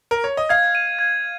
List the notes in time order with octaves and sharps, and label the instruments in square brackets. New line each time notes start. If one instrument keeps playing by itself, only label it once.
[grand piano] A#4
C#5
D#5
[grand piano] F5 [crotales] G#6
[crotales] D#7
G#6